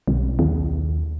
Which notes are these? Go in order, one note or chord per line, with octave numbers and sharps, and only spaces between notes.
B1
D#2